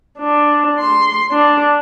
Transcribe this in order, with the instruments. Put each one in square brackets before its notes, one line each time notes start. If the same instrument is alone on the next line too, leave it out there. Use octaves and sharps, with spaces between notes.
[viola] D4
C6
D4